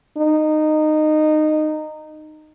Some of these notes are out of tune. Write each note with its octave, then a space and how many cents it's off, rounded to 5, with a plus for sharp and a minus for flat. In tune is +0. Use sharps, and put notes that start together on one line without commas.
D#4 -15